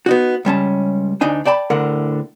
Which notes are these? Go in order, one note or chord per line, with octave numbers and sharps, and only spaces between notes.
B3 D#4 F#4
C#2 G3 C#4 A5
D2 D4 D#4 G#5
D5 G5 A5 B5
D2 A2 D3 A#4 F#5